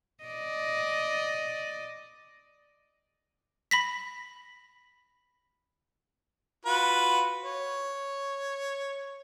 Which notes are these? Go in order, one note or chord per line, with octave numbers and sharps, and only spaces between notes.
D5 D#5
B5 A#6 B6
F4 F#4 B4
C#5